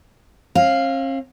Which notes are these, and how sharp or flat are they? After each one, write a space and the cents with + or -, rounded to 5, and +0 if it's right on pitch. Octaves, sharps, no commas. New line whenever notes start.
C#4 -45 F5 +0